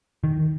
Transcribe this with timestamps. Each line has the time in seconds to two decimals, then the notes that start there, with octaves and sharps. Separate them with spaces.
0.24 D#3